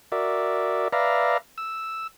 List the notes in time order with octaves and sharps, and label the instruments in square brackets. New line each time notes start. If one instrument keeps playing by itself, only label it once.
[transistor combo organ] F#4 A#4 D5 E5
B4 D5 E5 F5 A#5
E6